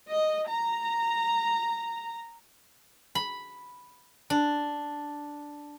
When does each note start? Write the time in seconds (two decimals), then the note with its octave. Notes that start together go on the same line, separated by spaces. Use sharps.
0.10 D#5
0.49 A#5
3.15 B5
4.30 D4